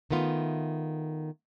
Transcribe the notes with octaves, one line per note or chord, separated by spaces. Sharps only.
D#3 A3 B3 F4